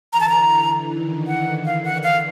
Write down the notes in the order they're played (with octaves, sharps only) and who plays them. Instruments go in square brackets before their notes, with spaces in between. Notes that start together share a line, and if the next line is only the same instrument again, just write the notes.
[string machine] D3 E3 [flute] A#5
[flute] A5
A#5
[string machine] D#3
[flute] F#5
F5
F#5
F5